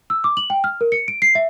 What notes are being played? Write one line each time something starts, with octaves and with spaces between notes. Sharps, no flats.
E6
D6
F#7
G5
F6
A#4
C#7
D7
C7
E5